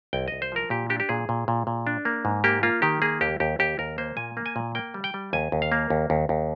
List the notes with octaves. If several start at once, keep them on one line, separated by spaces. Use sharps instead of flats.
C2 G5
C2 D#5
C5
F3 A#4
A#2 G4
D4 G4
G4
A#2 G#4
A#2
A#2
A#2
D4
A#3
G#2
A#3 G4
A#3 F4
D#3 G4
A#3 G#4
D#2 G4
D#2 G4
D#2 G4
D#2 A#4
A#3 C5
A#2 G#5
A#3
G#5
A#2
A#3 G5
G3
G5
G3
D#2 G#5
D#2
F5
A#3
D#2
D#2
D#2